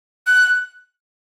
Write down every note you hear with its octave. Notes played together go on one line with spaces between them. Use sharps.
F#6